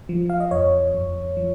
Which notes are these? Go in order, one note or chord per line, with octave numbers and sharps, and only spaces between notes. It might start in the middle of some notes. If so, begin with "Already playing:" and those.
F3
F5
D#5
F2 C#5
F2
F3